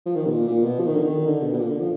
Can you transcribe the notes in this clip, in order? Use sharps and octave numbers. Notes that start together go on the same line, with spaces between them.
F3
D#3
B2
A#2
A#2
B2
F3
D#3
D3
D#3
D3
B2
B2
A#2
D3
F3